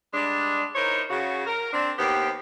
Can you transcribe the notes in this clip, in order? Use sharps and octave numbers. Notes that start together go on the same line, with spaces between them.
G3 G#3 D4
D#4 E4 A#4 C5 C#5
C#3 F#4
A#4
C4 D4
D#2 B3 C4 G4